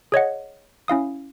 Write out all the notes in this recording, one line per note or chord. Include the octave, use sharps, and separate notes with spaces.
G#4 C#5 D#5 F#5
C#4 E4 F5 D#6